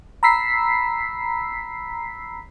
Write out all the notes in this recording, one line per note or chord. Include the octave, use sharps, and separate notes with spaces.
A#5 B5 E6 B6 C7